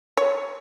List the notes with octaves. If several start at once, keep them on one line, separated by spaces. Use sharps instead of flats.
C#5